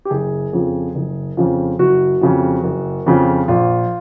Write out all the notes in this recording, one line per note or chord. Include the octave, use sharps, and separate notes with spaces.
G4
F#1 G#4
F2 C#3 F3
F#1
F2 C#3 F3
F#1 F#4
F2 C#3 F3
F#1
F2 C#3 F3
A#1 F4